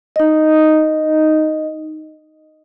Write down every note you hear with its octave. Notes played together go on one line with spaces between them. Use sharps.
D#4 D#5